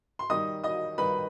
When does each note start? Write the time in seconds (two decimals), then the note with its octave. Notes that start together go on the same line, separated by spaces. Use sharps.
0.19 C6
0.30 D#3 G3 D#4 D#5 D#6
0.64 D#5 D#6
0.98 D#3 G3 D#4 B4 B5